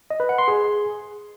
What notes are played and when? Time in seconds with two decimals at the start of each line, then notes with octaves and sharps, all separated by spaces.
0.10 D#5
0.20 B4
0.29 F#5
0.38 C6
0.48 G#4